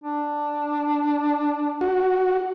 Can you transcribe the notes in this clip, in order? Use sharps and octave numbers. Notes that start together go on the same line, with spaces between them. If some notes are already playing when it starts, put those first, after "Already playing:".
D4
F#4